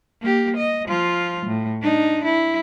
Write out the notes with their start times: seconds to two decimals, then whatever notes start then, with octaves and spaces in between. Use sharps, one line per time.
0.21 A#3 G4
0.57 D#5
0.87 F3 F4
1.46 A2
1.82 D4 D#4
2.24 E4